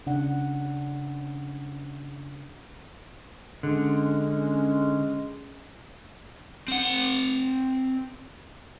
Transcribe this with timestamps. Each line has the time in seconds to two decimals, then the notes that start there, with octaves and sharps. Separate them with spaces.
0.07 C#3 D4 F#5
3.63 D3 G#3 C#4
6.68 C4 F#5